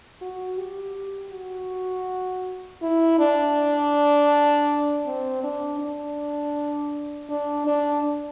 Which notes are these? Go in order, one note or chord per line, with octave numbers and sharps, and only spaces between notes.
F#4
G4
F#4
E4
D4
C4
D4
D4
D4
D4